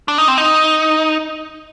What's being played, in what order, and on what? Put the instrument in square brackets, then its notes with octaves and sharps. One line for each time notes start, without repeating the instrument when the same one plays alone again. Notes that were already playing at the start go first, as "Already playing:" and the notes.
[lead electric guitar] D4
D#4
C4
D#4